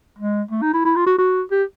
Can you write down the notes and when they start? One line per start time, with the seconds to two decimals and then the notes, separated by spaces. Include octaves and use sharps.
0.19 G#3
0.51 A3
0.62 D#4
0.73 E4
0.85 E4
0.96 F4
1.07 F#4
1.19 F#4
1.52 G4